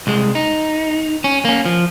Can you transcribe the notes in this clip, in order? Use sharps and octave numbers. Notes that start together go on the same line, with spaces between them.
C2 G#3
D#4
C#4
A#3 C#4
F3